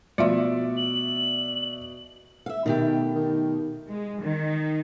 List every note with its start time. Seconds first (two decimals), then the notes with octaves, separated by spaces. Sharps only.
0.18 B2 F3 A3 F4 D5 E5
0.77 F#7
2.46 E5 F5
2.66 B2 D#3 A3 G4
3.15 D#3
3.86 G#3
4.22 D#3